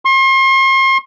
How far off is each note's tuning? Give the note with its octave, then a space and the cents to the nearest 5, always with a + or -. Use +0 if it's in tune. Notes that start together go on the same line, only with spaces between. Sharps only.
C6 +40